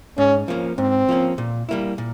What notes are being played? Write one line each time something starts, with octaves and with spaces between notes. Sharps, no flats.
G#2 C#4
F3 A#3 C#4
G#2 C4
F3 A#3 C#4
A#2
G3 A#3 E4
A#2